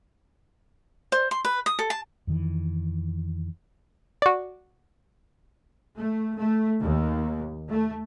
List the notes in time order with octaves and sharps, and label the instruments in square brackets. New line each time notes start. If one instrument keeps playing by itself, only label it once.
[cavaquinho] C5
C6
B4
D#6
A4
A5
[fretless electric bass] F2 D#3 E3
[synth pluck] F#4 D5
[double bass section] A3
A3
D#2
A3